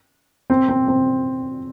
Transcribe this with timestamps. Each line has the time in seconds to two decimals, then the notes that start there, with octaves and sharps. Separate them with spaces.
0.50 C4
0.69 C4
0.88 C4